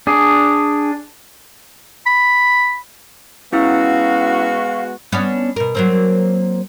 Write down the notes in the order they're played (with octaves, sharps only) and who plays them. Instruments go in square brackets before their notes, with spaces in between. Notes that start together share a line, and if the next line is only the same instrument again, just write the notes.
[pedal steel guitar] D4 G#4
[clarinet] B5
[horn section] G#3 B3 F#4 [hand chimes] C#4 E4 E6 [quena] F5
[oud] B3 C#4 D4
B2 A#4
F#3 A#3 C4